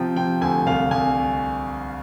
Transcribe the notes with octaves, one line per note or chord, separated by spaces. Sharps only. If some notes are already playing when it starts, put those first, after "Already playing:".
Already playing: C3 F3 G5
C3 G5
D2 G#5
C2 F5
C2 G#5